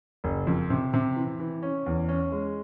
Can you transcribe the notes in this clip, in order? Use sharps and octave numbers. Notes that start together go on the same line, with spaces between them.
F#1
F2
C3
C3
E3
E3
C#4
E2
C#4
G#3